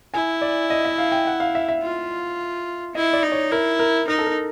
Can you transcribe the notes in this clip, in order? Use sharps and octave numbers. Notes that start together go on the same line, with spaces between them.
E4 G#5
D5
D#5
E5
F5
G5
F#5
F5
E5
E5
F4
E4 D#5
D5
D#4
C#5
E4 A#4
A#4
D#4 A#4
A4
A#4